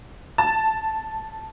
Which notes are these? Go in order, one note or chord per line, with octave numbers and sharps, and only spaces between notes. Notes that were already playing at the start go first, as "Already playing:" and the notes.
A5